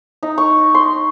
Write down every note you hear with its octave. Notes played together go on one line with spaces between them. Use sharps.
D#4
C#6
C6